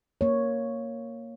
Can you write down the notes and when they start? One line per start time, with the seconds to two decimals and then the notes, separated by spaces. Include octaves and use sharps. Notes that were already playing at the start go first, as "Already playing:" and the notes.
0.21 A#3 C#5